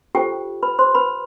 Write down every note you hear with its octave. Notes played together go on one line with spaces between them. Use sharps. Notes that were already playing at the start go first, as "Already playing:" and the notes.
F4 G4 A4 C5 G5
B4 B5
C5 C6
B4 B5